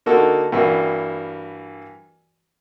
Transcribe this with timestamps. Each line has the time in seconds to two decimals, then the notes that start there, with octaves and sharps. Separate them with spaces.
0.06 D3 A#3 D#4 F#4 A4
0.52 G2 E3 A#3 F#4